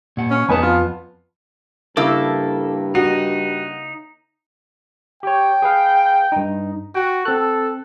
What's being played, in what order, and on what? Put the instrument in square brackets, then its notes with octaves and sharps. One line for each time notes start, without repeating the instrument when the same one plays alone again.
[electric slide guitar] A#2 F#5
[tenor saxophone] C#4
[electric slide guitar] F2 A5 [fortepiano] B3 G#5 B5 [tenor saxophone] D#4
[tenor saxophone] F4
[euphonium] G2 [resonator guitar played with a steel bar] C#3 A#3 E4 [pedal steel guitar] A4 D6
[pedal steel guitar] D#4 [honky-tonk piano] F#4
[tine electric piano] G4 C#5 [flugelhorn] G5
[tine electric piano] G#4 B4 F5
G2 D#4
[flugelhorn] F#4 [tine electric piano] G5
[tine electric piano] C4 F#6 [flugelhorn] A4